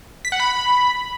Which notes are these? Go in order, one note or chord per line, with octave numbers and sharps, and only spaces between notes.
B6
F#5
B5